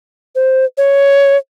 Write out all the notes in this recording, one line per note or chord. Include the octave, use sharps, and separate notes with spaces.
C5
C#5